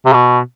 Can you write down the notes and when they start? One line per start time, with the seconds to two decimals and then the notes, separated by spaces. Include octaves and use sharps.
0.06 C3
0.13 B2